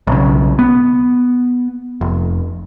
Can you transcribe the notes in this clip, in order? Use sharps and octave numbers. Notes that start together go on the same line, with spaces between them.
B1 C#3
B3
F1